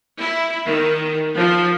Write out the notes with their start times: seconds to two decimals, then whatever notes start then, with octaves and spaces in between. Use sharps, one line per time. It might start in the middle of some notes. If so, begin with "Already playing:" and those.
0.18 E4
0.67 D#3
1.37 F3